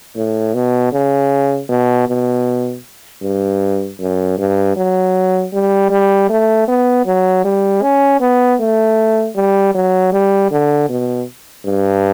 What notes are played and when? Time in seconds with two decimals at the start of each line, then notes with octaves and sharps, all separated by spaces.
0.16 A2
0.54 B2
0.92 C#3
1.69 B2
2.08 B2
3.22 G2
4.00 F#2
4.38 G2
4.77 F#3
5.53 G3
5.91 G3
6.30 A3
6.68 B3
7.06 F#3
7.45 G3
7.82 C#4
8.21 B3
8.60 A3
9.36 G3
9.74 F#3
10.13 G3
10.51 D3
10.89 B2
11.66 G2